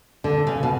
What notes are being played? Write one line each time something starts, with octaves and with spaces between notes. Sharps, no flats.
D3
C#3
B2